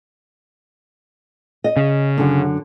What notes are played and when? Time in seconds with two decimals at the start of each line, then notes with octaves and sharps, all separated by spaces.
1.64 D#5
1.77 C#3
2.18 F#2 D3